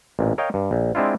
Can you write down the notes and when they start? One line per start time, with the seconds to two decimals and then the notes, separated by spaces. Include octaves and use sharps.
0.19 A1 A#2
0.38 A#4 C#5 D#5 F5 G5
0.54 G2
0.71 A#1
0.95 G#3 C4 D4 E4 F4